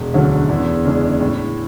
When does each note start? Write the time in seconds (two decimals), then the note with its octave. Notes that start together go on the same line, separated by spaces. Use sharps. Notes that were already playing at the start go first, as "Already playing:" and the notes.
Already playing: E1
0.14 D2 D3 F#3 C#4
0.49 E2
0.85 C#3 G#3 D4
1.20 A2